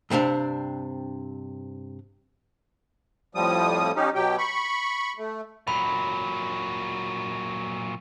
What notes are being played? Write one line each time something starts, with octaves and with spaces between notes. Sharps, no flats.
G2 C3 C4 D4 F5
F2 A2 F3 G3 D#6
C#4 D#4 G4
B2 F#3 G4 G5
B5 C#6
A3
A#2 F#3 B5